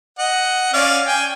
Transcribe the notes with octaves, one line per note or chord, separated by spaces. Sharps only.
D#5 F#5
C#4 D5 F5
G5 G#5